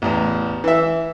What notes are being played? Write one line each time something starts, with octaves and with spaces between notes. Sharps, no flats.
A1 E2
E3 E5